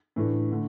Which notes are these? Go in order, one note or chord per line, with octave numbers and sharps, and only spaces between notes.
A2 E3 A3 D4
D3 A3